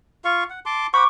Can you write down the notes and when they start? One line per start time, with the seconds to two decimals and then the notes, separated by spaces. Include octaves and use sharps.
0.25 F4 F5 C#6
0.50 F#5
0.66 A5 C6 D6
0.94 C5 F#5 B5 C#6 D6